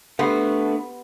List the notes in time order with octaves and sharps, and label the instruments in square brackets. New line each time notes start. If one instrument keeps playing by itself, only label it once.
[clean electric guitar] D3 A3 [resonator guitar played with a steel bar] B3 [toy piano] G4 F#5 C6